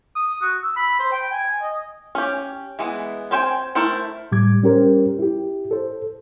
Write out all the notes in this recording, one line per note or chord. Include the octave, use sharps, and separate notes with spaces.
D#6
F#4
E6
B5
C5
G5
G#5
D#5
C#4 G4
E3 G#3 B3
C4 C5 G5 G#5
A3 E4 A#4 C5
A2 G3 D6 G#6
G3 C#4 G4 A#4 C5
E4 G4
A4 C5